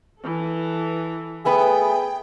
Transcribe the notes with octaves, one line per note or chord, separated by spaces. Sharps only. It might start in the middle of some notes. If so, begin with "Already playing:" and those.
E3 A4
A3 B3 G#4 B4 G5